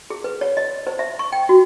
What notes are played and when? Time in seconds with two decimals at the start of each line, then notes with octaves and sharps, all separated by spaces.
0.10 G#4
0.24 B4
0.41 C#5
0.57 D#5
0.87 C5
0.99 E5
1.19 C#6
1.32 G5
1.49 F#4